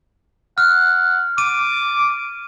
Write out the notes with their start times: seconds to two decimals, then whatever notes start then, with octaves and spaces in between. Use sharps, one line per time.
0.58 F#5 F6
1.38 D6 D#7